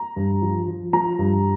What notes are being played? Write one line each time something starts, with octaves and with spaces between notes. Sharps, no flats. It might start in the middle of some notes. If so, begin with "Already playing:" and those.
Already playing: A#5
G2
F3
F3
F3 A#5
G2